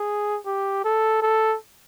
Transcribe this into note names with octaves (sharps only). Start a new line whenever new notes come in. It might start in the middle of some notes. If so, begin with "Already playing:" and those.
Already playing: G#4
G4
A4
A4